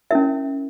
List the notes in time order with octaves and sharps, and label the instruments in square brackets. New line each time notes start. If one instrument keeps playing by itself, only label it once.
[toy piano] C#4 E4 A#4 E5